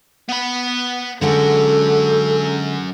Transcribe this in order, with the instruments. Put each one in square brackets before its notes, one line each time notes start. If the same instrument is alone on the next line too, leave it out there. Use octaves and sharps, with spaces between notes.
[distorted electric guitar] B3 B5
[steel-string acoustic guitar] D3 G#3 F#4 [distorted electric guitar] F#3 C#4 [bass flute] A4